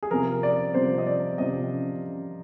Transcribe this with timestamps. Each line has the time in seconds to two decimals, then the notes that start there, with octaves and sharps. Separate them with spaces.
0.03 G#4
0.11 C3 F3 A#4
0.43 D5
0.74 C3 F3 C5
0.98 D#5
1.07 D5
1.38 C3 F3 D#5